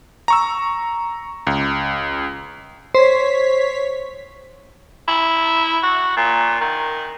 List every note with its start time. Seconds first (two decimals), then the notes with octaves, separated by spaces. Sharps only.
0.28 A#5 C#6 E6
1.47 C#2
2.95 C5 C#5 B6
5.08 E4
5.83 F#4
6.17 A#2
6.61 D#3